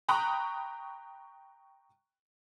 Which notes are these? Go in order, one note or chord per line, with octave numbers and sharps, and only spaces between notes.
G5 A#5 B5 C#6 D#6 F#6